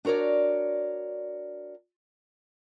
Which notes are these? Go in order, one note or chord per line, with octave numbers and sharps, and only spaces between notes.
D4 F#4 A#4 C#5 D5